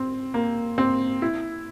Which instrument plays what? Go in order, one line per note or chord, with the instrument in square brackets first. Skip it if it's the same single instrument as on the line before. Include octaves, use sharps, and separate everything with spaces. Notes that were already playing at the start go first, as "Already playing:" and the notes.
Already playing: [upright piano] C4
A#3
C4
E4